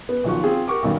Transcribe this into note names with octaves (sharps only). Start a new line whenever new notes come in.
B3
B1 D#3 F3 F#4 C#6
C4 F4 G#4
G4 A#4 F#5 C#6 D6
B1 G2 D#3